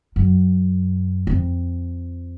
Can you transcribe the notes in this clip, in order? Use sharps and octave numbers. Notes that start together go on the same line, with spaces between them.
F#2
F2